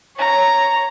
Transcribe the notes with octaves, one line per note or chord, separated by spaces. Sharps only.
C#5 A#5